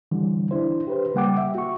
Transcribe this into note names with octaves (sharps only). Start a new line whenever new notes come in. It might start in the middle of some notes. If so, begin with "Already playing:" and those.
D3 E3 G3
D4 E4 C5
G4 B4 C5
C#3 G3 A#3 F#5 G5 D6
E5
F#4 C#6